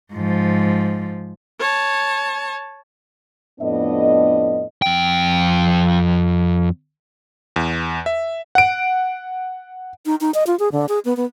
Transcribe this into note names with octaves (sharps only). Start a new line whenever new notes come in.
G#2 F3
C#5 A5
F2 A2 B3 D4 D#5
F2 G5
E2
E5
F#5 D7
D#4
D#4
D#5
F4
G#4
D3
G#4
B3
B3